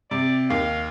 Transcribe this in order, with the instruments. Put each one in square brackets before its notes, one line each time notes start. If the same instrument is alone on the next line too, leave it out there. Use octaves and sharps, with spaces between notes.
[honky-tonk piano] C3 [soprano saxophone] D5
[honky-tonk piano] D#2 [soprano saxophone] F5